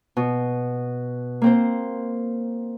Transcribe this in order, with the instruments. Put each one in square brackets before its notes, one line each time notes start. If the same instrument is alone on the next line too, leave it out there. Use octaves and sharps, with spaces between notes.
[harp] B2
A#3 C4 C5